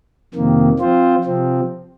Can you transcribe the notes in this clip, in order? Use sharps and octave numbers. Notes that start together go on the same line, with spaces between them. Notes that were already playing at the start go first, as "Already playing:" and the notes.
F2 C3 D#3 A#3
F3 C4 F4 C5
C3 F3 C4